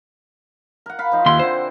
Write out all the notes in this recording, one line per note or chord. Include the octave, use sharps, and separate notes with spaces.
A#4 F#5
F5 B5
F3 D#4
D#2 E4 F#5 C6
D3 C4 C5